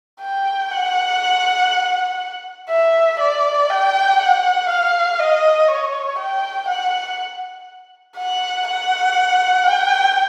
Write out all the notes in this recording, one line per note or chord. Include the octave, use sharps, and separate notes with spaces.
G5
F#5
E5
D5
G5
F#5
F5
D#5
C#5
G5
F#5
F#5
F#5
G5